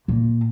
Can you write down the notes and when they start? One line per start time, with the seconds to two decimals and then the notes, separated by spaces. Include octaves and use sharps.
0.08 A#2